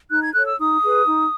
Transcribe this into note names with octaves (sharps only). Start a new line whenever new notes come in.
D#4 F#6
G#6
A4 C#5 F#6
E6
D#4 D#6
G#4 B4
D#4